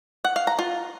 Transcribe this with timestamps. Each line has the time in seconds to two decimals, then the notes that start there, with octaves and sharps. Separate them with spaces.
0.24 F#5
0.36 F5
0.47 A#5
0.59 F4